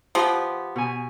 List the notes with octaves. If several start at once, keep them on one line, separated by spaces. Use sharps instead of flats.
F3 B3 G4 G5
B2 G#5